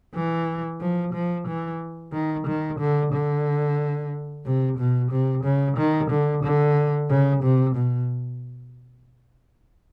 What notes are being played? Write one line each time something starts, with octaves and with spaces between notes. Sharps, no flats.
E3
F3
F3
E3
D#3
D#3
D3
D3
C3
B2
C3
C#3
D#3
D3
D3
C#3
C3
B2